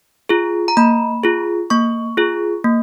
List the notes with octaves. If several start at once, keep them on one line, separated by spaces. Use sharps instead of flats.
F4 G#4
A#5
A#3 B5
F4 G#4
A#3 C#6
F4 G#4
A#3